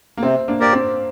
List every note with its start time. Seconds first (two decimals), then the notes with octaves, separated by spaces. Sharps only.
0.17 A#3
0.23 C3 C4
0.48 A#3 D4
0.60 A#3 G4 A#4 D5
0.73 C4